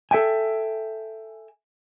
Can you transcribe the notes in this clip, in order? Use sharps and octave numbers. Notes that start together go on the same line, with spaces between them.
A4 E5 G5 G#5